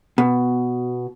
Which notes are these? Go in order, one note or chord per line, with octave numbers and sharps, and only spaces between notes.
B2